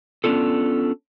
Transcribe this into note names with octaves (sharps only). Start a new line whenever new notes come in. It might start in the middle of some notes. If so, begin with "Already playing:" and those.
B3 C#4 D4 F4 A4